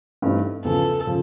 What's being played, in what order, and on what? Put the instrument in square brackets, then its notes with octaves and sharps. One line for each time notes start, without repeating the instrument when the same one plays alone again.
[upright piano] G2 E3 A3 C4 D#4
[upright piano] E2 C#3 F3 [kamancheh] A4
[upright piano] C#3 F3